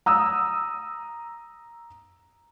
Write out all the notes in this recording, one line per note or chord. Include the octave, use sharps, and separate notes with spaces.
A#5 D#6 E6